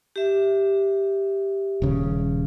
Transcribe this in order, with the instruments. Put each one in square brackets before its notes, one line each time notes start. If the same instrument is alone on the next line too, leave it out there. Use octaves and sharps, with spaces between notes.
[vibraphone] G4 E5
[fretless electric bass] D#1 C#3